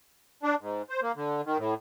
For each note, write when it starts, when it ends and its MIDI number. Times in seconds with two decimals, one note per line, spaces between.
0.43 0.55 62
0.61 0.82 44
0.90 1.00 72
1.02 1.12 58
1.16 1.41 50
1.45 1.58 51
1.58 1.74 45